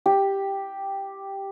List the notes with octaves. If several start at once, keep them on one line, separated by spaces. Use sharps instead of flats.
G4